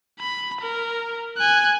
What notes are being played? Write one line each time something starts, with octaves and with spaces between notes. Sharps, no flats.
B5
A#4
G#5 F#6